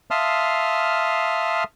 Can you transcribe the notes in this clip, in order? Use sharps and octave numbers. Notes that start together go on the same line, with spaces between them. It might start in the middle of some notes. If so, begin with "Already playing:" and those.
E5 F5 A5 C6 D#6 F6